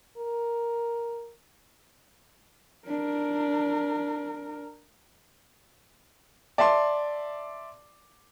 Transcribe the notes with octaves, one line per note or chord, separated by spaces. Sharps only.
A#4
D4 A#4
D5 E5 A5 C6